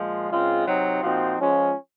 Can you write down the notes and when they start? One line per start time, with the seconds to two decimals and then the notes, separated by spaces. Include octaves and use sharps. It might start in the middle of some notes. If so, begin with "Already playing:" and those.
Already playing: A#2 F3 G#3
0.30 C#3 G#3 C4 F4
0.66 C3 F#3 C4 D#4
1.02 A#2 F3 C4 D#4 F#4
1.38 F3 G#3 C#4 F4